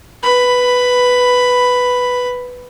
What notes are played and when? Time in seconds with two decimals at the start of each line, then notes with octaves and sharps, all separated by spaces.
0.23 B4 B5